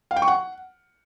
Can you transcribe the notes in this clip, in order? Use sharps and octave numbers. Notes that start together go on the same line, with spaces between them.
F5
G5
C#6
F#5